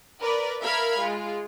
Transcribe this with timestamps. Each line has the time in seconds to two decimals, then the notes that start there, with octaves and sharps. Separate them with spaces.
0.20 A#4 B4 D5
0.60 A#4 E5 F5 B5 F6 G#6
0.99 G#3 F4